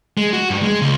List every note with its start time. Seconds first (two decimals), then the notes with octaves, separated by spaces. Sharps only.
0.17 G#3
0.33 F#4
0.50 G2
0.63 G#3
0.82 C#2